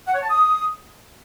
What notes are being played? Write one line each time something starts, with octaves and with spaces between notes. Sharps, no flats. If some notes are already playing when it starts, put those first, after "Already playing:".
F#5
C#5
A5
D#6